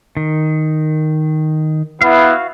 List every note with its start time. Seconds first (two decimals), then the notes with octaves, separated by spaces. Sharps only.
0.17 D#3
2.02 B3 E4 F#4 F5